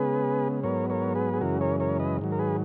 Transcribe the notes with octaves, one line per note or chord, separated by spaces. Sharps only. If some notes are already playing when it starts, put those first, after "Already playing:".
Already playing: C#3 G#3 B3 G#4 B4
G#2 F#3 B3 A#4 C#5
A#4 C#5
G#4 B4
G#4
F#2 C#3 E3 G#3 F#4 A#4
A#4 C#5
A#4 C#5
B4 D#5
G#2 D#3 F#3
A#4
G#4 B4